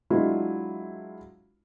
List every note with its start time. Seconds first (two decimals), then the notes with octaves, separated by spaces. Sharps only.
0.10 F#3 G#3 D4 E4 F4